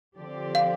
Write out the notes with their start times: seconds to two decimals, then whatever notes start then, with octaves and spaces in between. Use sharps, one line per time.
0.18 D3 F3 C4 G4 D5
0.55 F5